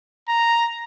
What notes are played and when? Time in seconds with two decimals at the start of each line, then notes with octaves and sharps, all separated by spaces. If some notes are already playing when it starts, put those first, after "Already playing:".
0.28 A#5